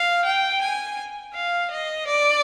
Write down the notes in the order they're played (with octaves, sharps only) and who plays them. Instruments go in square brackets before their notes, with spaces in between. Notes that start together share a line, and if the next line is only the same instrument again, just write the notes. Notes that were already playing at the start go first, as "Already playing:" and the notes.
Already playing: [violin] F5
G5
G#5
F5
D#5
D5